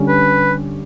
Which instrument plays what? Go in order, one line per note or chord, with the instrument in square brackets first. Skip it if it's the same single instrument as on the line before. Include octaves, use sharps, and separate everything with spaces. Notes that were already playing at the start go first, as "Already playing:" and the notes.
Already playing: [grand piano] D3 G3 C#4
[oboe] B4